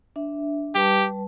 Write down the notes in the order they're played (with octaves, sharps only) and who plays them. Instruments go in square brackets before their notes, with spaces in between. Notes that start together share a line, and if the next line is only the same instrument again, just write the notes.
[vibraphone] D4 E5
[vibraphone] G3 B4 A5 [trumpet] G4